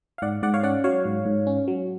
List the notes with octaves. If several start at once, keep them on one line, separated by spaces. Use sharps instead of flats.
F5
G#2 D5 F#5
G#2 D5 F#5
C#5 F5
C#4 D5 F#5
F#3 C#5 F5
G#2
G#2
C#4
F#3